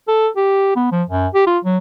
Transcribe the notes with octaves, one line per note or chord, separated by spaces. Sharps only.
A4
G4
B3
F3
F#2
G4
F4
F#3